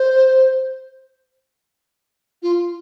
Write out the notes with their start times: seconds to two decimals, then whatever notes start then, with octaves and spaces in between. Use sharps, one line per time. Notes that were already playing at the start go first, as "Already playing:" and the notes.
Already playing: C5
2.43 F4